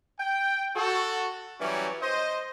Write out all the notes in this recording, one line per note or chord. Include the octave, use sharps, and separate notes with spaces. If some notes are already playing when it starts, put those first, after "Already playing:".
G5
F#4 A4
E3 F#3 G3 C#4
C5 D#5